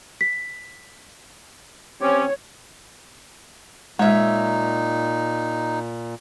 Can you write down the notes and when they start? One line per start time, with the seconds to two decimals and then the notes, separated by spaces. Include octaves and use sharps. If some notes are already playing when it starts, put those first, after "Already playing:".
0.21 B6
2.01 C4 C#4 G4 C#5
3.99 A#2 G#3 D#4 C#5 E5